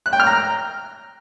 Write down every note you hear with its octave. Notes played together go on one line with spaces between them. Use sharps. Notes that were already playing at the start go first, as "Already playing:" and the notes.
F#6
G5
F6
A#5